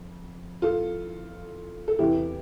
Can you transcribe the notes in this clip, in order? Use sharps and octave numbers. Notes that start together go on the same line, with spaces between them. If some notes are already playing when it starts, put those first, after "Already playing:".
Already playing: F2
F4 A4
A4
E2 C3 E3 E4 G4